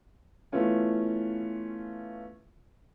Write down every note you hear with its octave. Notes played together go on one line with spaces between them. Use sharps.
E3 A3 B3 C#4 F4